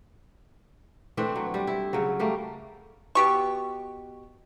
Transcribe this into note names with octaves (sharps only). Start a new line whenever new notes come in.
E3 A3 C4 D4
F#3
G3
E4
C#3 F#3
G3 A3 A#3
B2 G4 C#6